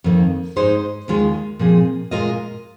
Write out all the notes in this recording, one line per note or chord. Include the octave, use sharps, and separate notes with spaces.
F2 D#3 A#3
G#2 G#3 D#4 G#4 C5
D#2 D#3 G#3 F4 G#4
A#2 F3 C4 G#4
A#2 G#3 F4 A#4 D#5